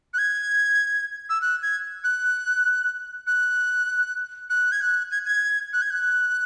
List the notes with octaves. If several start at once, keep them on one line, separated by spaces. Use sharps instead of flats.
F#6
G#6
E6
F#6
G#6
F#6
F#6
F#6
G#6
F#6
G#6
G#6
F#6
G#6
F#6